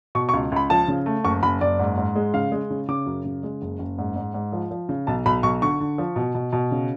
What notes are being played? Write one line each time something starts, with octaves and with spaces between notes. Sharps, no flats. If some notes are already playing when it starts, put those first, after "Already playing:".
B2 C#6
C#6
C#2
C#2 B5
F3 A5
C#3
A3
F#1 C#6
F#1 B5
F#1 D5
G#2
G#2
G#3
C#3 F5
G#3
C#3
C#3 D6
F#2
C#3
G#3
F#1
F#1
G#2
G#2
G#2
F3
F3
C#3
B1 A5
B1 B5
B1 C#6
D3 C#6
D3
F3
B2
B2
B2
C#3